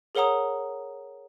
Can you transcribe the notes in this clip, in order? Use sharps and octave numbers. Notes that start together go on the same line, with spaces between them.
G#4 A#4 C#5 F#5 A#5 D#6